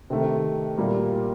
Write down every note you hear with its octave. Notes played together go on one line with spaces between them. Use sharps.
C3 D#3 A3
A#2 G3 A#3